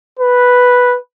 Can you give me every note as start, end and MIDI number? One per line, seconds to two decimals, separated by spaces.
0.19 0.97 71